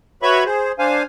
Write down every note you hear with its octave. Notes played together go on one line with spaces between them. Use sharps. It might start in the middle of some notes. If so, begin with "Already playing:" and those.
F#4 B4 C#5 E5 B5 C#6
G#4 C5
D4 C5 F5 G#5